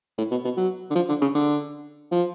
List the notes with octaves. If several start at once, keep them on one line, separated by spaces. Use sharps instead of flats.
A2
B2
B2
F#3
D3
F3
D3
C#3
D3
F3